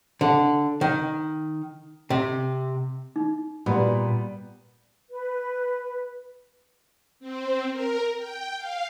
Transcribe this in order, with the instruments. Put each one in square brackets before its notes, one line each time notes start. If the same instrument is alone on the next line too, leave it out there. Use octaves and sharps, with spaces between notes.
[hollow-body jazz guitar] D3
D#3
C3
[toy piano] D#4
[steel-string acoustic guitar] A#2 [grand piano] G3 B3 [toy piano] F#4
[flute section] B4
[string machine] C4
A#4
G5
F5